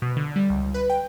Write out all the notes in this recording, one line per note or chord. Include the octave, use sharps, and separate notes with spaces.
B2
D3
G3
C#2
B4
G5